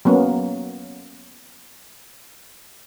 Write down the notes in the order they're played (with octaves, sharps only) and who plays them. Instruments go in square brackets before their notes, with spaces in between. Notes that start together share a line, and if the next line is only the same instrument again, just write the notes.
[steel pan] F#3 A#3 B3 C#4